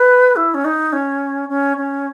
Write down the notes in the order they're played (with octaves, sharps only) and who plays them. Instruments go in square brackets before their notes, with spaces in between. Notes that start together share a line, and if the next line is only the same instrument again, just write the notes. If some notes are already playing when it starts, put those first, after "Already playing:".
Already playing: [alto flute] B4
E4
C#4
D#4
C#4
C#4
C#4